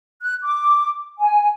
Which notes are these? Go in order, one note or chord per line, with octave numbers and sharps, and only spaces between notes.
F#6
D6
G#5